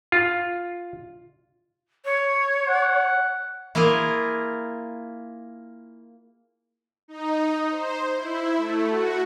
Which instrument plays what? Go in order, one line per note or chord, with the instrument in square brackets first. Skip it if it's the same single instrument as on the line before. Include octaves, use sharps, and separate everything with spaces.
[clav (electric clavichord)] F4
[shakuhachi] C#5
[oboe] F#5
[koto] A#3 E4 F4 G#4 A#4
[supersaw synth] D#4
C5
E4
A3
F#4